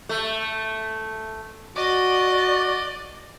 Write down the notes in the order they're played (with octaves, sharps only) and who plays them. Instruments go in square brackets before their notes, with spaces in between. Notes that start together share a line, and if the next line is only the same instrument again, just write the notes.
[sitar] A3
[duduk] F#4 [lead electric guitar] D5 [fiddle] D#5